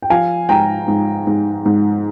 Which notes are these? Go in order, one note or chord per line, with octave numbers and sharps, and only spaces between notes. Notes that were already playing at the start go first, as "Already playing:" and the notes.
G5
F3 F5 G#5
G#2 G5 A#5
G#2
G#2
G#2